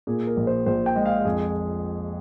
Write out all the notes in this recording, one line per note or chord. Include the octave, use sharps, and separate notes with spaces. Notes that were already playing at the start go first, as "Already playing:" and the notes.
A#2 G#4
A#4
A#1
C5
A#1 C5
G5
G#3 D#5
F5
F2 G#4